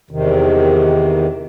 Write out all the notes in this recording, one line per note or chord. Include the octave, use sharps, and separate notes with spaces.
E2 C3 D#3